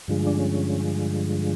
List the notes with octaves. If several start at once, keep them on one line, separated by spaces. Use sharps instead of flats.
G2 D3 F3 G#3
D4
C#4